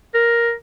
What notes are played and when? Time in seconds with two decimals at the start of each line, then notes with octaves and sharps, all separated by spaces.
0.14 A#4